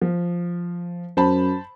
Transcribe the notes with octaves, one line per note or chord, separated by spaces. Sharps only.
F3
F#2 C5 A5 B5